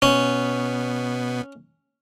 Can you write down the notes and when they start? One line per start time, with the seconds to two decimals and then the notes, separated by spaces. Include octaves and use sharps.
0.02 B2 B3 C#4